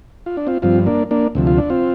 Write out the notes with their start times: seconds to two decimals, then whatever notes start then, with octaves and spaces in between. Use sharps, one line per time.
0.26 F4
0.37 D4
0.47 C4 F4
0.62 G2 F3 C4 F4
0.86 A#3 D4
1.11 A#3 D4
1.35 D2 C3 F3
1.47 F4
1.58 D4
1.70 C4 F4